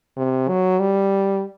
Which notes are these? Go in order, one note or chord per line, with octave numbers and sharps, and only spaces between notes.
C3
F#3
G3